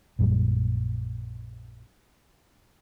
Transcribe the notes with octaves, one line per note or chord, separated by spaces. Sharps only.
A#1 F#2 A#2 G3